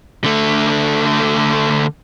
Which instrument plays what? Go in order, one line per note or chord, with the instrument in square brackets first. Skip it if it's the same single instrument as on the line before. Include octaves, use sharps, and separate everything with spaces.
[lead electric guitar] D3 A3